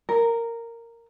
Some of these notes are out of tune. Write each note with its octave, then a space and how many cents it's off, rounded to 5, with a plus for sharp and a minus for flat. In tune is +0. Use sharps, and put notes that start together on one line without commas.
A#4 -10